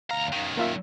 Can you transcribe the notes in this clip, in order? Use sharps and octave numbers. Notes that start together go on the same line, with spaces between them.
D2 F5 A#5
F#2 D#3
A#3 F4 E5